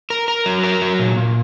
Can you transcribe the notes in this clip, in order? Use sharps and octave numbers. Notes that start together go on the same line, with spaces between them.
A#4
A#4
F#3
A#4
F#3
A#2
A#2